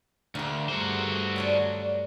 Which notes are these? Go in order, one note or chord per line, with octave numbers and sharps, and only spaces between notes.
D2 A#3 G#4
G2 A3 F#4 C5
F#3 C#4 D4